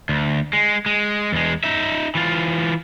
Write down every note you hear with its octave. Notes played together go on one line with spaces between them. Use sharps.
D2
G#3
G#3
E2 G#3
D#4 E5
E3 F4